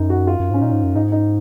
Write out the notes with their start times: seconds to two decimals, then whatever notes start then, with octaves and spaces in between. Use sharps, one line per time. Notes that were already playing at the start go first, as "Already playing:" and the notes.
Already playing: F#2 D#4
0.10 F#4
0.27 F4
0.40 F#2
0.51 G#2 C#4
0.61 A#2 D#4
0.72 G#2
0.84 F#2
0.95 G#2 D#4
1.12 D#4